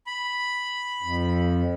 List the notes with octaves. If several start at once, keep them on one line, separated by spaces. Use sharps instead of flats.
B5
F2